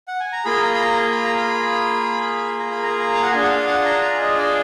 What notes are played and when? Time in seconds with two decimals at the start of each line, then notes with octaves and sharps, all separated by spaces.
0.08 F#5
0.20 G#5
0.33 A#5
0.45 A#3 F4 G#4 B5
0.63 A#5
0.75 B5
0.81 A#5
1.11 B5
1.24 A#5
1.37 B5
2.59 A#5
2.71 B5
2.83 A#5
3.15 F5
3.22 F#5
3.31 D4 F4 G#4 G#5
3.44 F#5
3.49 F5
3.67 F#5
3.85 A#5
4.02 A#5
4.20 D#5
4.38 D5